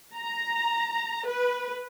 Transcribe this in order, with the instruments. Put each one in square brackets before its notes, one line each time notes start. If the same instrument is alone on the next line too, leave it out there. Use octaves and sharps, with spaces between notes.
[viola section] A#5
B4